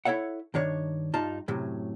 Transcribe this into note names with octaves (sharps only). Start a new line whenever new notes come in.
E4 A4 C#5 E5 F#5
G2 D#3 D4 C#5
G2 D#4 F4 A5 A#5
F#2 A2 C3 F#3